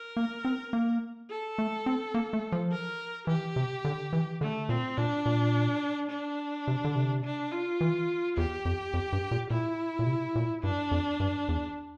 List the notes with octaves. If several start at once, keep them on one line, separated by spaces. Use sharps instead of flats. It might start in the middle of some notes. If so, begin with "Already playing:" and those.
Already playing: A#4
A#3
C4
A#3
A4
A3
C4
A#3
A3
F3
A#4
E3 G4
C3
D3
E3
D3 A3
A#2 C4
A#2 D4
A#2
D4
C3
D3
C3
D4
F4
E3
E2 G4
F2
F2
G2
A#2
A#2 E4
A#2
C3
A#2
G2 D4
F2
G2
E2